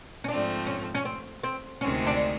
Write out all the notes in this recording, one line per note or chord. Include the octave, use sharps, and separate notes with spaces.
C#4
G#2 F3 A3 C4 D4
C#4
C#4
C4
C4
D2 C3 D#3 G#3 C4 C#4
D4